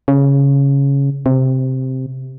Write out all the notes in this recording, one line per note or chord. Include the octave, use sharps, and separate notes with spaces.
C#3
C3